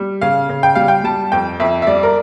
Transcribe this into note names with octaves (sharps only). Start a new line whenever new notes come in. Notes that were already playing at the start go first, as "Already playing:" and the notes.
Already playing: G3
C#3 F5
C#3
G5
G3 F5
G5
G3 A5
F2 G5
F2 E5
E5
G3 D5
A#4